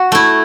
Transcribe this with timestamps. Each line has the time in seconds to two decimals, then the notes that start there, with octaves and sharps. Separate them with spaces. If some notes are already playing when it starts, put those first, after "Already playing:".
Already playing: F#4
0.12 A3 E4